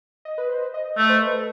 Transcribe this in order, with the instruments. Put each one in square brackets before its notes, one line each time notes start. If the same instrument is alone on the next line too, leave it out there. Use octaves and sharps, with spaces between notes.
[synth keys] D#5
B4
C5
C5
D#5
D#5
[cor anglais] A3 [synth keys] D#5
[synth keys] C5
B4
A4